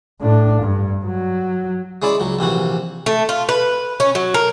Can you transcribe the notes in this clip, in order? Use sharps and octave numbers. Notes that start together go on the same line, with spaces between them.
A2 D4
G2
F#3
G#3 C#4 E4 D5
C#2 F#3
A#1 C3 E3 F#4
A3
F4
B4
C#4
F#3
A#4